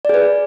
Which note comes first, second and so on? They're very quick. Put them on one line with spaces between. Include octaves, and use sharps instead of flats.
D5 G#4 B4